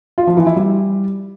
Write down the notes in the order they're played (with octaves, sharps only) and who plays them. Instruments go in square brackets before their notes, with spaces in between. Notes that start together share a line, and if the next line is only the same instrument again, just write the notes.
[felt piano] F4
F3
E3
E4
G3